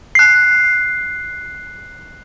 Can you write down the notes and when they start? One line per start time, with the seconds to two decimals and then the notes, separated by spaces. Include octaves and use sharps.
0.15 F#6 C7